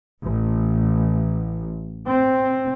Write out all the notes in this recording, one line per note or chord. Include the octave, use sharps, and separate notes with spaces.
A1
C4